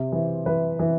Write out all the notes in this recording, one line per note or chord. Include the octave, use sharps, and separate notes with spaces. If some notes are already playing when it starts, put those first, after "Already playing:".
Already playing: C3 C5
E3
E3 B4
E3